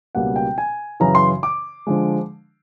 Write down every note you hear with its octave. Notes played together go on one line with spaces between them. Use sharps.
C#2 B2 G3 A#3 F#5
G5
G#5
F#2 C#3 E3 A#5
C6
D6
D3 F3 G#3